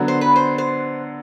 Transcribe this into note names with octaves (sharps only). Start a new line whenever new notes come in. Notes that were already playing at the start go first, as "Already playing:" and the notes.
Already playing: D3 F#3 B3 D4
C5
B4
C5
C5